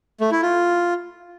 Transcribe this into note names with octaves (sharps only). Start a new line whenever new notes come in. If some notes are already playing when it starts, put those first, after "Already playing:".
A3
E4
F4